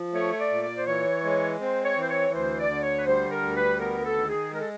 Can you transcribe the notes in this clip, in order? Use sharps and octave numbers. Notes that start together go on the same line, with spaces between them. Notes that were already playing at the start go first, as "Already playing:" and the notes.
Already playing: F3
A3 C#5
C#5
D5
A#2
D5
C5
E3 C#5
G#3
C4 C5
C#5
E3
C5
C#5
D2 C5
D5
D3
C#5
B4
G3 C5
A#4
D2
B4
B3 A#4
A4
D#3
G#4
G#3 A#4
A4